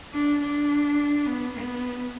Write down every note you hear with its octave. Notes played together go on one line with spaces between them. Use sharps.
D4
D4
B3
B3